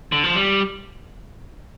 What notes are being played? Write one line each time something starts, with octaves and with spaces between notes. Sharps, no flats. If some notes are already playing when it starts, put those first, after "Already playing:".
D3
F3
G3